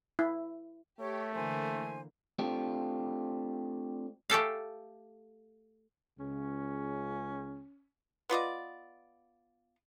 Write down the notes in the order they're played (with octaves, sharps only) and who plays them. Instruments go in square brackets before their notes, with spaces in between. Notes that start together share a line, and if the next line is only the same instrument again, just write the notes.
[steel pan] E4
[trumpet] A3 [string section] G4 [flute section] C#5
[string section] D3 E3 A#3 [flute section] C5 G#5
[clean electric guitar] A3 C4 D4 F4 G4
[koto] A3 G4 A4 F5
[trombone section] C#2 C#3 [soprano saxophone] C#4
[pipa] B3 F4 D5 D#5